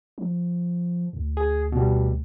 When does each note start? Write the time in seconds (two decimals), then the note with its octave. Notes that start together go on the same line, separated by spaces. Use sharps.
0.18 F3
1.13 D2
1.37 G#4
1.72 B2 G3